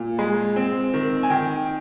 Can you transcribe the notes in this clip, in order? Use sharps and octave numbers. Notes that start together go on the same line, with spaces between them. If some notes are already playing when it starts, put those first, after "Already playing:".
Already playing: A#2
G#3
C4
D#3
G#5
D#3 G5